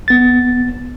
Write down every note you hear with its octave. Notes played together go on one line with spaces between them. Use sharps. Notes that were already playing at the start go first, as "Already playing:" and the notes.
B3 A6